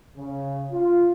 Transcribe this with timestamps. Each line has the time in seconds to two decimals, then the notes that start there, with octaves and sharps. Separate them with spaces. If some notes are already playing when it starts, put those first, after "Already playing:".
0.17 C#3
0.72 F4